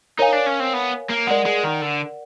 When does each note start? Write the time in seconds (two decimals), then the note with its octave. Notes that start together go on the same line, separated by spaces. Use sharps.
0.19 D#4 A#4 C#5 F5 G#5
0.33 D4
0.46 C#4
0.60 C4
0.73 B3
1.10 A#3
1.27 G#3 A#4 D5 F#5
1.46 G#3
1.64 D#3
1.82 D3